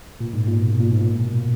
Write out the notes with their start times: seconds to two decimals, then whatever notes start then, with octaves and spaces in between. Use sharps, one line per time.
0.20 A#2
0.33 G#2
0.47 A#2
0.60 B2
0.80 A#2
0.91 G#2
1.01 A#2
1.20 B2